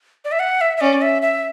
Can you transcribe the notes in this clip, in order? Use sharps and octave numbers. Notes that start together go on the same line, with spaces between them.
D5
E5
F#5
E5
E5
C#4 D5
E5
E5